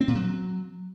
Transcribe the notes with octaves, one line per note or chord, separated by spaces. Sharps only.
C4
A#2
F#3